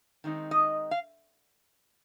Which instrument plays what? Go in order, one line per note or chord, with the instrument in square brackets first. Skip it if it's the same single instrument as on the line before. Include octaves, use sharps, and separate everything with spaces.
[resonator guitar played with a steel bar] D#3 G#3 C4 D#4
D#5
F5